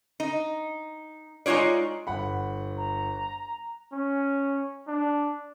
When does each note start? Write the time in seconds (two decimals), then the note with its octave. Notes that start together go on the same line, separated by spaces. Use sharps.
0.20 D#4
1.46 G#3 D#4 F4 C#5 D5
2.07 G1 F#5 B5
2.77 A#5
3.93 C#4
4.88 D4